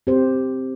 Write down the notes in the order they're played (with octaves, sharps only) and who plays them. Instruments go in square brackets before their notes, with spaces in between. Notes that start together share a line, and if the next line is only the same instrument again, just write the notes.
[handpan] C4 G4 C5